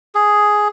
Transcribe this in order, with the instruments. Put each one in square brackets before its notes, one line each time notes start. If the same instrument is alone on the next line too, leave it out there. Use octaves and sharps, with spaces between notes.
[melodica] G#4